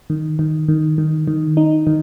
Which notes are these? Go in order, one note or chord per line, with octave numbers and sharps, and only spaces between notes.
D#3
D#3
D#3
D#3
D#3
D#4
D#3